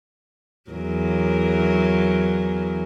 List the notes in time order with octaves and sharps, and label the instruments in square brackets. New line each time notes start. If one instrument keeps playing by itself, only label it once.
[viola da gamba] E2 F#3 A#4